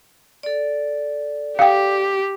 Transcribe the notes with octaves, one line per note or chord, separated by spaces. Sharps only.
A4 D5
G4 F5 G5